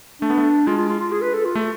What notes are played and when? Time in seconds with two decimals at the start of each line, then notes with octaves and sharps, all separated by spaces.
0.21 A3 D4
0.30 B3
0.37 A3
0.67 G#3 F4
0.78 F4
0.89 F4
1.00 F4
1.12 G#4
1.22 B4
1.34 A4
1.45 F4
1.55 A3